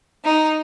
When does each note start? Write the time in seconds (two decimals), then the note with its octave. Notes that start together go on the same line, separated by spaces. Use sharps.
0.25 D#4